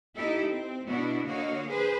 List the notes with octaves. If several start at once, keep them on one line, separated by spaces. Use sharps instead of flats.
A#3 D#4 E4 G4 A4
C4
B2 B3 D4 E4 F#4
D3 A#3 F#4 C#5 D#5 F5
G#4 B4 C5